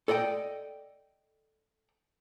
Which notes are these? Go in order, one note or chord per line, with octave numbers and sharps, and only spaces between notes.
A4 D5 D#5 F#5 G5